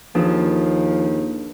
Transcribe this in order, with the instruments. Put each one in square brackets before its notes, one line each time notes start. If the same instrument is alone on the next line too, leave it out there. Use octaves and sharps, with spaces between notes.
[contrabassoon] D#2 [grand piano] F3 [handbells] D4 G#4 B4